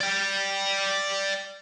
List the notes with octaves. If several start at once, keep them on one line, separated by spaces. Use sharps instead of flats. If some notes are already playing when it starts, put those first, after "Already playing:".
D5 G5